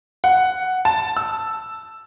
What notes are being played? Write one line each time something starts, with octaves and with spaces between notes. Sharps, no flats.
F#5
A5
E6